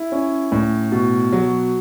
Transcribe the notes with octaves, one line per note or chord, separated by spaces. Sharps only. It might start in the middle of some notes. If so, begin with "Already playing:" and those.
Already playing: E4
C#4
A2
B2
F#3